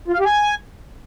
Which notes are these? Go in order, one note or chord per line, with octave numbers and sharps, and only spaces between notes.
F4
F5
G4
G#5